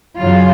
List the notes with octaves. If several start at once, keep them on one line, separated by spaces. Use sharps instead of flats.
F#2 C#3 F#3 F4